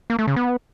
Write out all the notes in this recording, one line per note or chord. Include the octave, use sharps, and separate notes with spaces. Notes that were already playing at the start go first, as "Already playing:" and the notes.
A#3
A3
C#3
B3